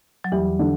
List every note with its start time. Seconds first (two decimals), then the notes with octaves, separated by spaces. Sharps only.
0.24 F#3
0.32 E2 E3 G3
0.59 D3